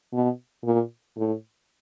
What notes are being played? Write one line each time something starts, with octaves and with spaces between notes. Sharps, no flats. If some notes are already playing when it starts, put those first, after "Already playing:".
B2
A#2
A2